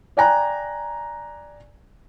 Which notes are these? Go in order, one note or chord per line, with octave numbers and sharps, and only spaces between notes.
D5 G5 G#5 A#5 F#6